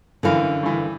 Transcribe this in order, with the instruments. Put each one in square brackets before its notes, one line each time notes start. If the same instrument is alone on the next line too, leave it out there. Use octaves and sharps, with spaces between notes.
[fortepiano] F#2 E3 [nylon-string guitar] D3 A#4 F5
[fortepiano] G2 E3